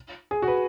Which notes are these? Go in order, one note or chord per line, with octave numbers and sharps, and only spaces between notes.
G#4
F#4
B4